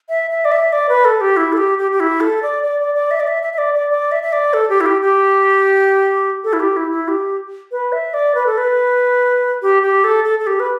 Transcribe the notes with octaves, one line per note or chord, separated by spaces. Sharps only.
E5
E5
D5
E5
D5
B4
A4
G4
E4
A4
G4
G4
G4
E4
A4
D5
D5
D5
D5
E5
D5
E5
E5
E5
D5
D5
D5
E5
E5
D5
A4
G4
E4
G4
G4
A4
E4
G4
E4
E4
G4
B4
E5
D5
B4
A4
B4
G4
G4
A4
A4
A4
G4
B4